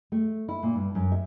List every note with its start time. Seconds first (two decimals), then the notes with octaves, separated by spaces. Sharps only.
0.12 A3
0.49 E4
0.63 A#2
0.75 G2
0.95 F#2
1.12 E5